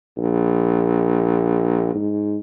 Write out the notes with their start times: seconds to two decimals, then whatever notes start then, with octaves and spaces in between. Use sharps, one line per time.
0.18 A#1
1.95 G#2